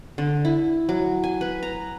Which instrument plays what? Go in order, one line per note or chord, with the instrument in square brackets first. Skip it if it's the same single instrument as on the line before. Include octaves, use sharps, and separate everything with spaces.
[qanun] D3
E4
F#3
G#5
B4
A#5